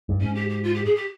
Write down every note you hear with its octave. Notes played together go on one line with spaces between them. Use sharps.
G2
G#2 C#4
G4
G4
F4
G4
G#4
G4